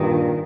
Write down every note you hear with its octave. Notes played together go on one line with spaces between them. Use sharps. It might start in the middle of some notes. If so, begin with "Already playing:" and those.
Already playing: G2 A#2 D#3